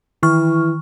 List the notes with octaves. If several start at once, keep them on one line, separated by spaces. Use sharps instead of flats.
D#3 E3 C#6 F6